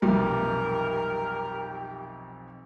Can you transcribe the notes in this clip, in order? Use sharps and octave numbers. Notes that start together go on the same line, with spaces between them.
B1 F2 C3 G3 G4 A#4